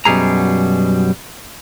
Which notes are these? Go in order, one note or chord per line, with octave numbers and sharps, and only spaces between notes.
F#2 B2 D#3 G3 G#4 A#5